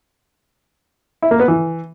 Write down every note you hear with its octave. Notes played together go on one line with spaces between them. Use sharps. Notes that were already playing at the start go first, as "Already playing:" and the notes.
E4
A#3
B3
E3